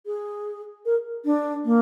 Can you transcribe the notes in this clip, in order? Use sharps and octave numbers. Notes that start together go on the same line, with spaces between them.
G#4
A#4
D4
A#3